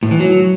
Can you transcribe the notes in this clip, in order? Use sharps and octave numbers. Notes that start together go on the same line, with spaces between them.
A2
E3
F#3